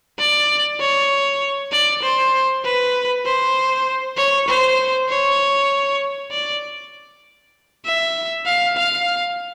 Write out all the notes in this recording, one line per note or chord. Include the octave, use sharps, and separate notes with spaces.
D5
C#5
D5
C5
B4
C5
C#5
C5
C#5
D5
E5
F5
F5